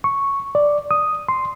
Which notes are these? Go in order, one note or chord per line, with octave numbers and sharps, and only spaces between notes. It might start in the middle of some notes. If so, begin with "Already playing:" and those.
C#6
D5
D#6
C6